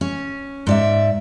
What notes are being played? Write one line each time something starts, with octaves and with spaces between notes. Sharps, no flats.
C#4
G#2 D5 E5